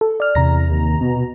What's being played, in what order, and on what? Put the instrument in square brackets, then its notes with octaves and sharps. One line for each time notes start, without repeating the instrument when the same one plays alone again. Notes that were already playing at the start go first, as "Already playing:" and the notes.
[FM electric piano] A4
D5 F6
[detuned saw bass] E2 [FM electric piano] C3 A#5 A#6
[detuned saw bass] D#2
B2